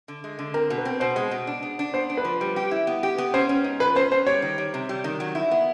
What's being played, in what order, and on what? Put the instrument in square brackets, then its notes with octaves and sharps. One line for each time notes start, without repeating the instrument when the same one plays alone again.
[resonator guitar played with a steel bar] D3
G#3
D3
[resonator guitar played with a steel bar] C4 [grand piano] A#4
[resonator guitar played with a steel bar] B2
[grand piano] B4
[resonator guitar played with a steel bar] C4
[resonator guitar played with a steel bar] B2 [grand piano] C5
[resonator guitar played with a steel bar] G#3
B2
D4
B3
D4
[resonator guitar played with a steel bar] B3 [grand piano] C5
[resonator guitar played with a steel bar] D4
[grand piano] B4
[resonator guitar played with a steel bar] F3
G3
G4
E4
B3
G4
B3
[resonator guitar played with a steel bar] C#4 [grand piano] C5
[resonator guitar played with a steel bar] C#4
G#2
[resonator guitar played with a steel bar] F3 [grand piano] B4
[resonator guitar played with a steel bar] C#4 [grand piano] C5
[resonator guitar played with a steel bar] C#4 [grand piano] C5
[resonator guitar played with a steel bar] G3 [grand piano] C#5
[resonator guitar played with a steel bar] D#3
G3
C3
G3
D#3
F#3
E4
B3